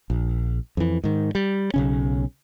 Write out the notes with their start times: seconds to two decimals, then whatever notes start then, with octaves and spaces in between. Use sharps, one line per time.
0.10 A#1
0.77 F2 E3
1.04 G#2 D#3
1.35 G3
1.74 B1 C#3 C#4